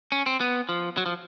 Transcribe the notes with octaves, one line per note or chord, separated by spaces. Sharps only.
C#4
C4
B3
F3
F#3
F3